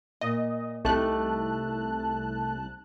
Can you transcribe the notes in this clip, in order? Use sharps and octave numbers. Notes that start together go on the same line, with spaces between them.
A#2 D#5
C2 A3 D#4 G4 A4 A5 F#6